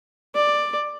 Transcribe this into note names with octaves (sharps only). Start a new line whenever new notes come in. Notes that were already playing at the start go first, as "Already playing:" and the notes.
D5